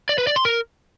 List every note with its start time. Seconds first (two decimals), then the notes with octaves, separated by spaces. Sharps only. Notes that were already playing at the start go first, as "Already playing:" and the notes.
0.09 D5
0.18 B4
0.27 D5
0.36 C6
0.45 A#4